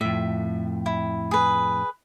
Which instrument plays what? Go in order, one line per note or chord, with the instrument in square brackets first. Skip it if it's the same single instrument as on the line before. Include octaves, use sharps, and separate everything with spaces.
[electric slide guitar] F2 A2 [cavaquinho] E5
[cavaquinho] E4
G#4 B4